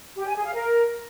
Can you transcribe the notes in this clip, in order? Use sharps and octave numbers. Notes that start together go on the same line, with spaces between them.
G4
G#5
G#4
F5
A#4